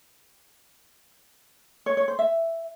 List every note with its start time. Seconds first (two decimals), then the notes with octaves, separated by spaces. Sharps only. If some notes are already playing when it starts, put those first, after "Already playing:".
1.86 C#5
1.97 C#5
2.08 C5
2.19 E5